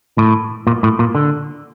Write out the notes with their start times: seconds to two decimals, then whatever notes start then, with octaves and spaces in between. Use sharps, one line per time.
0.18 A2
0.67 A#2
0.83 A2
0.99 A#2
1.15 D3